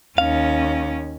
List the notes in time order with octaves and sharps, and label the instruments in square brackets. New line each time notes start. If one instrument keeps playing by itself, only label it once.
[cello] D#2 C#4 [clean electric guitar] F5